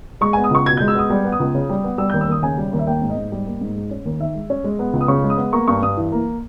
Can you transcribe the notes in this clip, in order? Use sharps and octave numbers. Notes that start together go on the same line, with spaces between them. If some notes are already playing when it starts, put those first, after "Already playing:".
G#3 C#6
B3 G#5
D#6
C#2 C#6
B2 G#6
G#3 G6
E6
B3 D#6
G3
B3
D#6
C#2
C#3
G3
B3
G3 E6
D#2 G6
E6
D#2 D#6
C#3 G#5
G3
D#2
E5
A#3 G5
G#2
D#5
G#2
G3
A#3
G#2
G#3
C#4
D#2
D#3 E5
G#3
C#4
G#3
B3
C#2
D#6
C#3 C#6
G#3
D#6
B3
A#3 C#6
G2 C#6
G2 D#6
E3
A#3